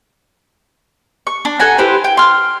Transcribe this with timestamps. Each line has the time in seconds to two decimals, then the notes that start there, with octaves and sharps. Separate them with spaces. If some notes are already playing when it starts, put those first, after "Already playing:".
1.27 C#6
1.45 D4
1.59 A4 F#5 G#5 A#5
1.78 E4 G4 B4 C5
2.04 G5
2.17 C6 F6